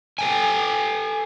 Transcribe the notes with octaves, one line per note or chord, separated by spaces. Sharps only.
A4 G5 G#5